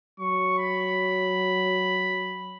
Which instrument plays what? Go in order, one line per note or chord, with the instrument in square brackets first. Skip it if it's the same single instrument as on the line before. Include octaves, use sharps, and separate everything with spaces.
[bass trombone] F#3 [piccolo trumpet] C#6
[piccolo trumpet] B5